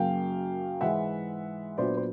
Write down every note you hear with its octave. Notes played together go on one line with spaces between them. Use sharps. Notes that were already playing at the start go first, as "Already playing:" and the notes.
Already playing: F#2 C#3 F#3 A#3 F5 G5
G#2 E3 G#3 E5 F#5
A#2 F#3 B3 D4 C5 D5
C5